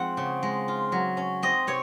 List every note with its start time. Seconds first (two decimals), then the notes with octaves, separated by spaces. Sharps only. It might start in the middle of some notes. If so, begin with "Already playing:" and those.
Already playing: F3 G#3 C4 F#5
0.17 C#3
0.43 G#3
0.68 F4
0.92 F#3
1.17 C#4
1.43 C4 D#5
1.67 C3 C#5